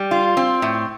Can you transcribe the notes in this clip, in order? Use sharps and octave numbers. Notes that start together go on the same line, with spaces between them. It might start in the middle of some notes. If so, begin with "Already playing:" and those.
Already playing: G3
F4
C4
A2